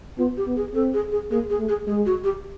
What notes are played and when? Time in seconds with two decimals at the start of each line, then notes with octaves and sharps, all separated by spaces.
0.18 B3 F4
0.37 G4
0.47 B3
0.56 G#4
0.74 C4 A4
0.94 G#4
1.12 G#4
1.31 A#3 G#4
1.50 G#4
1.59 A3
1.68 G#4
1.87 G#3 G#4
2.06 F#4
2.24 G4